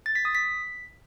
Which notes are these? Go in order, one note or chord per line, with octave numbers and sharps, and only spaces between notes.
A6
B6
D#6
B6